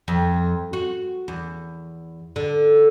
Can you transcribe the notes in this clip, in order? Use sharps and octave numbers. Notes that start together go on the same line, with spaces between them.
F2
F#4
E2
D3